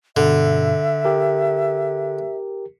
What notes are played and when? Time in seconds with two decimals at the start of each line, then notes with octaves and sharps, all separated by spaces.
0.17 G2 B2 D3 E5
1.05 G4 A#4